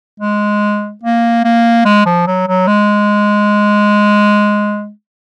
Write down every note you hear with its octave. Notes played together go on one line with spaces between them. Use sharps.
G#3
A#3
A#3
G#3
F3
F#3
F#3
G#3